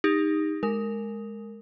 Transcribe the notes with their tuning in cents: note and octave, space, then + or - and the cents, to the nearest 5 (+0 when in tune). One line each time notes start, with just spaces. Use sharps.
D#4 +0 G4 +35
G#3 +10 A#4 -15